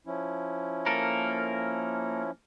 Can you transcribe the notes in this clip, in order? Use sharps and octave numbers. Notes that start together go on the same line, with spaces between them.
F3 C#4 E4
A#3 A4 A#4